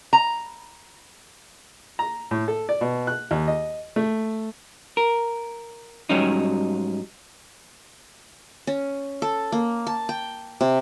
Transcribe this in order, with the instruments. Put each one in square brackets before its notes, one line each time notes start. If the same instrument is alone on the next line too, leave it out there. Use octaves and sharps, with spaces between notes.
[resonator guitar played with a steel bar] A#5
[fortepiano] A#5
A2
A4
D5
B2
F#6
D#2
D#5
A3
[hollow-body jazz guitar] A#4
G#2 F#3 G3 C#4 D#4
[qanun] C#4
A4
A#3
A5
G5
C3